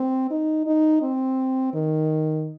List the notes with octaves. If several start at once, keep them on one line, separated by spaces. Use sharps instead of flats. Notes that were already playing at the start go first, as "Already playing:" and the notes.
Already playing: C4
D#4
D#4
C4
D#3